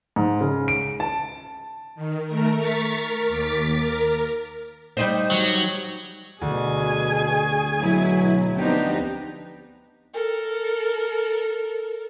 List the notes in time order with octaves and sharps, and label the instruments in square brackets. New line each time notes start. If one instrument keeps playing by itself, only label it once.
[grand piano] G#2
C#3
D7
A5
[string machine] D#3
A3 A#4
A#5 C#6 A6 B6
A#4
D#2 D6 A6 B6
A#4
[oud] G3 D#4 C5
[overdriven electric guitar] F#3
[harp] D2 [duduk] B2 [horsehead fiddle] G#4 G#5
[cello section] B2 E4 [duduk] F#3
[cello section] F3 C4 D#4 [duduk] B3 [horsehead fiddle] D4 G4
[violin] A4 A#4